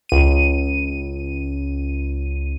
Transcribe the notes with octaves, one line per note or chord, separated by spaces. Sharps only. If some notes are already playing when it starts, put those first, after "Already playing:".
C#2 D#7